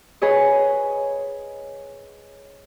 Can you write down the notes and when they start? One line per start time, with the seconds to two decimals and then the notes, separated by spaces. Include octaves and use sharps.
0.22 G#4 B4 C#5 D#5